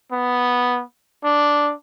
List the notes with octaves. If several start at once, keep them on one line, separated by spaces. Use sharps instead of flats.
B3
D4